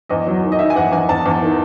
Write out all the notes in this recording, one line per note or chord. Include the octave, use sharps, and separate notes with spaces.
E2 D#5
F#3
D#3
D#5
D#3 E5
G#5
E2 F#5
E2 G#5
E2 A5
E2
D#3